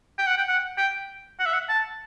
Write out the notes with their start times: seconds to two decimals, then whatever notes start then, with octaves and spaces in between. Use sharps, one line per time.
0.18 G5
0.27 F#5
0.38 G5
0.48 F#5
0.78 G5
1.39 F#5
1.46 E5
1.53 F#5
1.69 A5